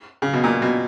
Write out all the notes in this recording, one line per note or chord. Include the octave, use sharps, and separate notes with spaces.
C#3
B2
A#2
B2